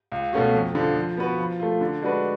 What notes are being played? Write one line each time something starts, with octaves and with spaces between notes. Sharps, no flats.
C#2
B2 A3 C#4 F#4
F2
D3 F3
F3
B3 F#4 B4
F3
A3 F4
D3
G#3 D4 F#4 B4